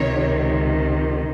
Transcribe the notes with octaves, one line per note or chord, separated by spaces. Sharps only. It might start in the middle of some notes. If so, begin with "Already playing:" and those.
Already playing: C#2 C3 D#3 C#5